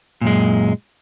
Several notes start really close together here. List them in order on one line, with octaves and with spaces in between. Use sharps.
A#2 F#2 G#3